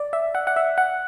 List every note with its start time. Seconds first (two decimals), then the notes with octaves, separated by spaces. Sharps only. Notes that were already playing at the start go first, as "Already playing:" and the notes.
Already playing: D5
0.13 E5
0.35 F#5
0.47 F#5
0.56 E5
0.78 F#5